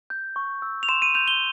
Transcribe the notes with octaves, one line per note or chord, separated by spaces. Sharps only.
G6
C#6
E6
F7
C6 E7
D#7
G6 F7
G7